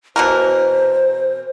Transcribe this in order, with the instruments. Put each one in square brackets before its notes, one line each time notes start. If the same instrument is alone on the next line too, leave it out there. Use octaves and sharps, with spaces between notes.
[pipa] B2 E3 A#4 [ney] C5